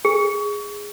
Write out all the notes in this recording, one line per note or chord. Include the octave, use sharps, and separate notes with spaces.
G#4